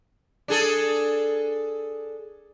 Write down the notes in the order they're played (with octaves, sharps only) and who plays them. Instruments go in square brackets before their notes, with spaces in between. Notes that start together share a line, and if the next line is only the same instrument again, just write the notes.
[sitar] D4 G#4 A4